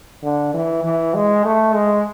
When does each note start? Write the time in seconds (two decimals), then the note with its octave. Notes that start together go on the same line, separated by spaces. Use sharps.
0.23 D3
0.54 E3
0.84 E3
1.14 G#3
1.45 A3
1.74 G#3